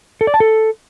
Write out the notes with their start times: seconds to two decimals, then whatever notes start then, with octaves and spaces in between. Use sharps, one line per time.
0.21 A4
0.27 D5
0.34 A5
0.40 A4